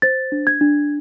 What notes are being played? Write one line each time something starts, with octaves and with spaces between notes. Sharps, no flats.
C5 A6
D4
G#6
D4